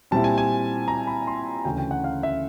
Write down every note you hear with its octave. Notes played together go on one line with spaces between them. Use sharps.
A#2 G3 C4 E4 A5
G#5
G#5
A#5
B5
C6
D2 C#3 E3 A3 C#4 G5
G5
F#5
F5
E5